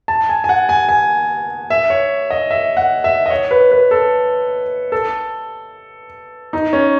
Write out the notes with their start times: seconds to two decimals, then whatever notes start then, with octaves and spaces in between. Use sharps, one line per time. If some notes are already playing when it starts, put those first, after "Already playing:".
0.08 A5
0.29 G#5
0.44 G#5
0.49 F#5
0.69 G#5
0.89 G#5
1.70 E5
1.90 C#5
2.30 D#5
2.51 E5
2.77 F#5
3.04 E5
3.26 D#5
3.30 C#5
3.51 B4
3.71 B4
3.91 A4
4.92 A4
6.53 D#4
6.73 C#4